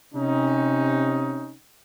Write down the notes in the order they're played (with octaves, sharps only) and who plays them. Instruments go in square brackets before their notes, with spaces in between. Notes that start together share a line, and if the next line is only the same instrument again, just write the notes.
[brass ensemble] C3 C#4 D#4